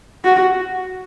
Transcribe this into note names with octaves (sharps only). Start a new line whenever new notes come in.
F#4